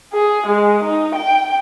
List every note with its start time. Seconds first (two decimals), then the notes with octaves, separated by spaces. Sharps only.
0.13 G#4
0.47 G#3
0.84 D#4
1.15 G5